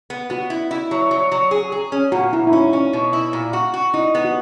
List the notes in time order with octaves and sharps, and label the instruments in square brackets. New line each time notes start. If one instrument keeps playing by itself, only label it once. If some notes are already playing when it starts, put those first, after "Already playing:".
[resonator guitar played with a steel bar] B3
[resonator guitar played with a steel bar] B3 [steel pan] F#4
[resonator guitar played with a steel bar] E4
E4
F#3
F#3
F#3
G#4
G#4
C#4
[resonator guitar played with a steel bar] A#2 [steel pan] F#4
[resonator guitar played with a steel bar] A#2 [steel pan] E4
[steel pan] E4
[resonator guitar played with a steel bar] C#4 [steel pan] D#4
[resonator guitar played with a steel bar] C#4
B2
E4
A#2
F#4
F#4
[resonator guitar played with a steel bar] D#4 [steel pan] E4
[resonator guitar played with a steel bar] B3
[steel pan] F#4